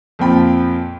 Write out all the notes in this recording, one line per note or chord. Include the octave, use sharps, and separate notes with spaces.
F2 A#2 F3 G5 B5